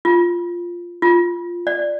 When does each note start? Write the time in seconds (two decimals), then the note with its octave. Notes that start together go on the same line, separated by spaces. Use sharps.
0.05 F4
1.02 F4
1.67 D5